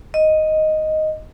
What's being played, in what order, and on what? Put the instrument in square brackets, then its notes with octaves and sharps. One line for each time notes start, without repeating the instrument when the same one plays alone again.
[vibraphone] D#5